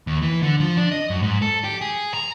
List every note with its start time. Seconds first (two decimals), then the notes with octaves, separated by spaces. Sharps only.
0.07 D#2
0.22 E3
0.42 D3
0.60 F3
0.77 D4
0.91 D#5
1.10 F#2
1.23 G#2
1.42 A4
1.64 G4
1.81 G#4
2.14 A#5